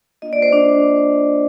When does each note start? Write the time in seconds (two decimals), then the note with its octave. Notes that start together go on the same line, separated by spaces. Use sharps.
0.22 A#3 D4 F4 D#5
0.33 D5
0.42 C5
0.52 D4 D5